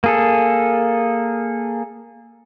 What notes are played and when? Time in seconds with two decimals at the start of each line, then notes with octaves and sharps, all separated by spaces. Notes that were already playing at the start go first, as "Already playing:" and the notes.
0.04 A#3 G#4 A4